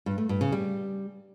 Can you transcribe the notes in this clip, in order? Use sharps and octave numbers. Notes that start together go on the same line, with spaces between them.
G2
A3
G2
C#3
G3